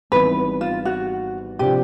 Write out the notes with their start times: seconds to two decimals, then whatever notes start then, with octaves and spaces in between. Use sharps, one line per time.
0.12 G#1 G#2 E3 G3 B3 B4
0.61 F4
0.85 F#4
1.59 C3 F3 A#3 D4 G4